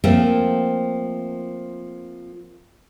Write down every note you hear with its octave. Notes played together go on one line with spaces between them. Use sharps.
F3 A3 A#3 C4